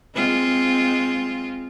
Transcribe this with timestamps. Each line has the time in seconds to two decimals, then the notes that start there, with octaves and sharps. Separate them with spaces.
0.15 G#3 C4 F4